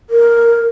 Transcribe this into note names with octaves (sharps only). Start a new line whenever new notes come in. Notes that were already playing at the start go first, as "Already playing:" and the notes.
A#4